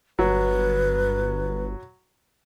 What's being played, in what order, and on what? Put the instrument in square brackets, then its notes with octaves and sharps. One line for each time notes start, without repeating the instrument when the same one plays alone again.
[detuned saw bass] G1 [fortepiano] F#3 [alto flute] B4